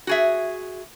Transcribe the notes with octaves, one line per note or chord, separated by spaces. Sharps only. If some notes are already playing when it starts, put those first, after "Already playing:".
F#4 G#4 E5